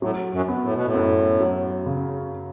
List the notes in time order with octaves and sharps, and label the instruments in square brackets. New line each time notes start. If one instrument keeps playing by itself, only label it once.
[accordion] A2 [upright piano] F#3
[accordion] F#2
[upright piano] B3
[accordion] A2
B2
A2
[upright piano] F#2
F#3
C#3